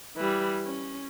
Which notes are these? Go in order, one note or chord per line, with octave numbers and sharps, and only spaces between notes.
E3 G3
C#4